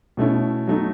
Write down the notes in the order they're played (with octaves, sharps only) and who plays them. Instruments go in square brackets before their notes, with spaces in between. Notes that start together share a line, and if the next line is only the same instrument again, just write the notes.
[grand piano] B2 A3 C#4 E4
F#3 A3 D#4